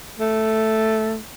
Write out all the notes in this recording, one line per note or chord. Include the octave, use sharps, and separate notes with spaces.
A3